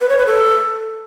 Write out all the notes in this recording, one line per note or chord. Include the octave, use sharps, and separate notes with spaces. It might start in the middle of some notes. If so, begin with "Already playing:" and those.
B4
C#5
B4
A4